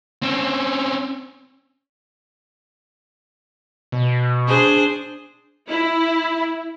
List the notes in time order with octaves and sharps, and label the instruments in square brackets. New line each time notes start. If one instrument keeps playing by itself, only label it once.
[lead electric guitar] C4 C#4
[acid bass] B2
[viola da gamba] D4 G#4 C5
[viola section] E4